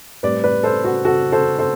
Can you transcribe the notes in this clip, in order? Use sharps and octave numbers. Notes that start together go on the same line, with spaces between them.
A2 G3 C4 B4 D5
B4 D5
A4 C5
F#4
F#4 A4
A4 C5
A4 C5